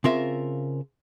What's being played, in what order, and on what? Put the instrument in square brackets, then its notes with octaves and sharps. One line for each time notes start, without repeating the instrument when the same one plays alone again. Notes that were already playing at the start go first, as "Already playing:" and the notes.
[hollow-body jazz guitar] C#3 C4 F4 A#4 E5